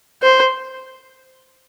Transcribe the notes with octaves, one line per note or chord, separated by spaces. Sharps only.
C5